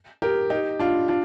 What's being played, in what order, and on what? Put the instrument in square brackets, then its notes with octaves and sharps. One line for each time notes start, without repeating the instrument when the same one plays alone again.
[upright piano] G4 A#4
D#4 G4
D4 F4
D4 F4